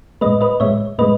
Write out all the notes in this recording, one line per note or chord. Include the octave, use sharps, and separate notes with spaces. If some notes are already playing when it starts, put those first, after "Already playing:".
A2 G#3 B4 D#5
B4 D#5
A2 G#3 C#5 E5
A2 G#3 B4 D#5